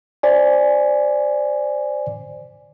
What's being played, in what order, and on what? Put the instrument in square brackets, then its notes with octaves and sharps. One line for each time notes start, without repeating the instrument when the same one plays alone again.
[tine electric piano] C5 D5 G#5